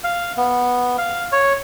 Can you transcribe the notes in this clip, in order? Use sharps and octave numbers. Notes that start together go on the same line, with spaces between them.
F5
B3
F5
C#5